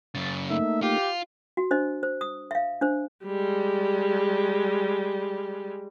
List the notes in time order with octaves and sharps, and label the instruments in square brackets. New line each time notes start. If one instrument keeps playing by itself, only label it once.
[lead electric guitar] F#2 C#3 [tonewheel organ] A6
[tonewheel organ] A3 A#3 D#4 [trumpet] E5
[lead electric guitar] F4 [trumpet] G4
[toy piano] F#4
D4 C5 D#5
C5
D#6
E5 F5
D4 C5
[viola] G3 G#3